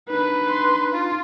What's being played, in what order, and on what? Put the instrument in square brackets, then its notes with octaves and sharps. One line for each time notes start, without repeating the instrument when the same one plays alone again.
[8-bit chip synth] D4 D#4 [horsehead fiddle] B4
[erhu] C6
F4